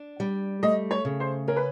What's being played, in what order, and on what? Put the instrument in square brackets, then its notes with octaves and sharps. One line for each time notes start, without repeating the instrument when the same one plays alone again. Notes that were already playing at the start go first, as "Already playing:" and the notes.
Already playing: [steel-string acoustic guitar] D4
G3
[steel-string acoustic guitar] A3 [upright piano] D#5
[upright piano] C#5
[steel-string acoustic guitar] C#3
[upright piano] C5
[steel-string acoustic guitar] C#4 [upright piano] A#4
[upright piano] B4